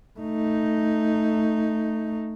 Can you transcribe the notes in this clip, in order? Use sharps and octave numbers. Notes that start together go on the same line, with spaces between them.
A3 D#4